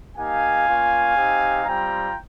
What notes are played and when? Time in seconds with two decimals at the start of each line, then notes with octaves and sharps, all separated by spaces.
0.17 A#3 D#4 G4 F5 G#5
0.67 A#3 C#4 F4
1.17 C4 D#4 G4
1.65 G3 C4 F4 G5 A#5